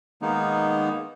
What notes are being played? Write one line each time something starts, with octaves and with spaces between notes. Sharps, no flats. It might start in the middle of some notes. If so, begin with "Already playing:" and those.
D#3 G#3 A#3 B3 D#4